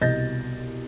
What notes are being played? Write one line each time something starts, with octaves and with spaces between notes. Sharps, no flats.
C2 B2 D#5 G6 A6 A#6